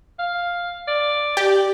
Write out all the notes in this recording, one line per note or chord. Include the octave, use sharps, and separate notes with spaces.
F5
D5
G4 D5